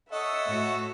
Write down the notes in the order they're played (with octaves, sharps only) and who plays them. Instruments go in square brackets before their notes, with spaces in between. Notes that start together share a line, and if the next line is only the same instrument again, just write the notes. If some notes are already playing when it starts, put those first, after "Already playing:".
[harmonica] A4 C#5 F#5 [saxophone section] D#5 [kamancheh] E5
[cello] A2 F#4